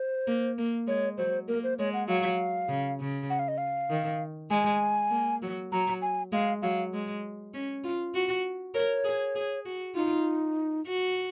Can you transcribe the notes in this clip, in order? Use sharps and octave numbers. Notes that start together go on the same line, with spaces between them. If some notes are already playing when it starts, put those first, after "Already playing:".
Already playing: C5
A#3
A#3
G#3 C#5
F#3 C5
A#3 A#4
C5
G#3 C#5
F#5
F#3 F5
C#3
C#3
F#5
F5
D#5
F5
D#3
G#3 G#5
A#3
F#3
F#3 A#5
G#5
G#3 F5
F#3 F5
G#3
C#4
F4
F#4
A#4 C#5
G#4
G#4
F#4
D#4 F4
F#4